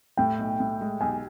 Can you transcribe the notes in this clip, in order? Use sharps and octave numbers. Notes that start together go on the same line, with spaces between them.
A2 G5
B1
A2
G#3
B1 G#5